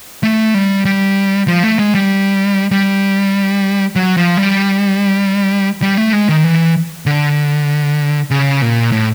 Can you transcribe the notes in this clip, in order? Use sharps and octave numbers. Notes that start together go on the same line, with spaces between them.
A3
G3
G3
F3
A3
G#3
G3
G3
F#3
F3
G3
G3
A3
G#3
D#3
E3
D3
C#3
A#2
A2